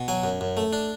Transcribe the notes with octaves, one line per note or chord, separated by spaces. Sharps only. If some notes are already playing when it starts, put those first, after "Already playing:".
Already playing: B2
F#3 G#5
F#2
F#2
A3
D4